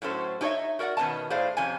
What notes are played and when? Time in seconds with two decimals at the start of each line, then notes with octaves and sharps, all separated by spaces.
0.02 A2 F#3 C#4 A4 C5
0.41 D#4 G4 G#4 C#5 D#5 E5
0.79 F#4 A#4 D5 D#5 F#5
0.97 B2 D#3 B3 C#4 D#5 A5
1.30 A2 G#4 C5 D5 F5
1.57 F2 C3 C#4 G#5